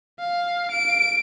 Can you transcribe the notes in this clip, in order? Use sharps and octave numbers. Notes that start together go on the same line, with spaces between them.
F5
D7